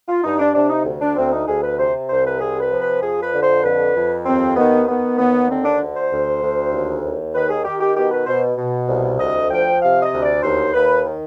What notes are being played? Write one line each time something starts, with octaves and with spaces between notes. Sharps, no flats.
F4
G2 D#4
D4
C3 D4
D#4
D2
D4
D2 C4
D#4
D2 G#4
B4
C3 C5
C2 C5
B4
C3 G#4
B4
F3
B4
F2 G#4
B4
D3
C5
F2 B4
F2
D#2 C4
D#3 B3
D#3 B3
D#2 B3
D3 C4
D4
D2
C5
D2
D2
D#2
D#2
D#3 B4
G#4
D#3 G4
G4
B2 G4
B4
B2 C5
B2
C2
D2 D#5
F3 G5
C3 F5
D#5
D2
D5
D#2 C5
D#2 B4
D#3